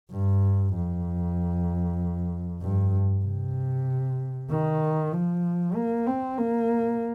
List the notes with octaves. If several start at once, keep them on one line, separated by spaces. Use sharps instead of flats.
G2
F2
G2
C3
D#3
F3
A#3
C4
A#3